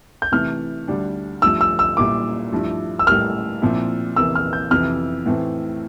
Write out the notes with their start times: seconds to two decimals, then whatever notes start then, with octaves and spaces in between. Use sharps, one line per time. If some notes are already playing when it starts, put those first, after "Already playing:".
0.22 G6
0.32 C3 E3 A3 E4 F6
0.87 D2 D3 G3 D4
1.42 G2 F3 A3 E6
1.61 E6
1.79 E6
1.97 A#2 G3 A#3 E4 D6
2.52 G2 F3 A3 E4
2.99 E6
3.06 A2 G3 A#3 F6
3.62 A#2 F3 C4 E4
4.16 E2 C3 E3 A#3 E6
4.35 F6
4.53 G6
4.71 F2 C3 E3 F6
5.26 A2 E3 A3 C4